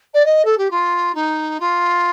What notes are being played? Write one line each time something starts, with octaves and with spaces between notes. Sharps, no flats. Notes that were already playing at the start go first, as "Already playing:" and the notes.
D5
D#5
A4
G4
F4
D#4
F4